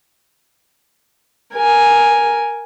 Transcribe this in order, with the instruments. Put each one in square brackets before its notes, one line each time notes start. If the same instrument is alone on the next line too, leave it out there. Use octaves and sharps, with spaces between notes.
[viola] A#4 G#5